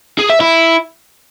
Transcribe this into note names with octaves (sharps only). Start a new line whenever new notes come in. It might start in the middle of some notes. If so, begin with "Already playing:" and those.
G#4
E5
E4